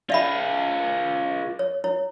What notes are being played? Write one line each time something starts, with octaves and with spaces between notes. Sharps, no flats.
F4 G#4 D5 E5 B5
C#5
E4 C#5